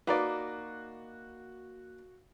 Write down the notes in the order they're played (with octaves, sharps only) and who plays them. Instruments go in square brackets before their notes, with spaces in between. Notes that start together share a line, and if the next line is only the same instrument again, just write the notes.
[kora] A#3 D#4 [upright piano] F#4 [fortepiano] B4 D5